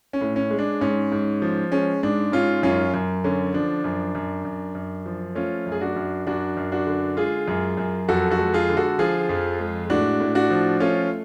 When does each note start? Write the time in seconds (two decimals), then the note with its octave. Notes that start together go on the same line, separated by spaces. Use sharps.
0.13 C#4
0.21 A2
0.36 C#4
0.51 G#3
0.59 D4
0.81 G#2 C#4
1.12 G#2
1.42 F3
1.72 G#3 C#4
2.03 G#2 D4
2.32 G#2 C#4 F4
2.63 F#2 C#4 F4
2.94 F#2
3.24 D3 C#4
3.54 F3 D4
3.84 F#2
4.15 F#2
4.45 F#2
4.75 F#2
5.06 F3
5.35 A3 C#4 F4
5.66 F#2
5.72 G#4
5.81 D4 F#4
5.96 F#2
6.27 F#2 D4 F#4
6.57 F#2
6.72 D4 F#4
6.87 D3
7.17 G#3 F4 G#4
7.48 F#2
7.77 F#2
8.08 F2 F#4 A4
8.31 F#4 A4
8.38 G#3
8.54 F4 G#4
8.69 D3
8.77 F#4 A4
8.99 F3 F4 G#4
9.29 F2
9.59 G#3
9.90 A2 D4 F#4
10.20 A2
10.35 D4 F#4
10.50 F3
10.80 A3 C#4 F4